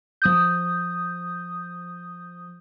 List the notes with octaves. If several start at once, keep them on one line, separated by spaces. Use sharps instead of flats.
F3 D#6 G6